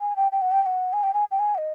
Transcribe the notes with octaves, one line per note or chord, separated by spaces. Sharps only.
G#5
G5
G5
F#5
G5
G5
F#5
G#5
G5
G#5
G5
G#5
F#5
D#5